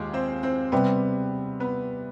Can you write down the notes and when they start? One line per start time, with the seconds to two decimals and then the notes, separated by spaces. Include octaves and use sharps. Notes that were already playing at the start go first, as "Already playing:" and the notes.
Already playing: D#2 G#3 F4 G4 G#4
0.13 C4 C5
0.43 C4 C5
0.72 C3 G3 B3 C4 B4
1.60 B3 B4